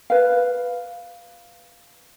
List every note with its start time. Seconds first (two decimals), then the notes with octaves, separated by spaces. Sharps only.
0.10 B4 F5